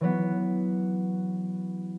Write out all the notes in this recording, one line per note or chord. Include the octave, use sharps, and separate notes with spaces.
E3 F#3 B3